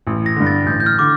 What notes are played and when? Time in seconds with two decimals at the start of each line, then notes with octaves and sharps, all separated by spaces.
0.07 A1
0.26 A#6
0.36 G2 D3
0.47 A6
0.66 A1 G6
0.80 G6
0.86 F6
0.99 D3 D6